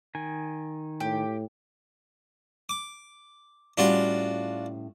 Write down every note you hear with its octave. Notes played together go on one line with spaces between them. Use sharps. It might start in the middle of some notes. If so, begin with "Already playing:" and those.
D#3 G#5
A2 G4
D6
A2 G3 C#4 D4 F4 F#4